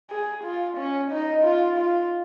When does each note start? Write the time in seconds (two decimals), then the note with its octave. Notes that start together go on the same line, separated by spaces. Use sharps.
0.10 G#4
0.44 F4
0.77 C#4
1.11 D#4
1.44 F4
1.77 F4